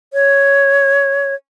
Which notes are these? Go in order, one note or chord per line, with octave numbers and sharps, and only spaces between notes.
C#5